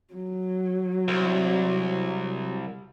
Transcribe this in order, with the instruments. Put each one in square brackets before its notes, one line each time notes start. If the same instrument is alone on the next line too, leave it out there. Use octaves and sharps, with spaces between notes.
[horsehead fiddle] F#3
[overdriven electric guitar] C2